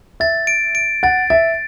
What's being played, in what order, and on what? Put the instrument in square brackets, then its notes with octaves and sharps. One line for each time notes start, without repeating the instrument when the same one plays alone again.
[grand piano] E5 [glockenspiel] A6
[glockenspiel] D7
D7
[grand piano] F#5 [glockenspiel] A6
[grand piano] E5 [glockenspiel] A6